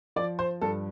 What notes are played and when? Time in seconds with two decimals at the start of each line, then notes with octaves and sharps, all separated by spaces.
0.16 F3 D5
0.39 C5
0.61 G2 A4